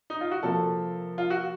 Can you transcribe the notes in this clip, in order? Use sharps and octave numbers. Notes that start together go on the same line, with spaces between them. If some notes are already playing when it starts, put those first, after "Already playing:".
D#4
F4
F#4
C3 F3 A#3 A4
F4
F#4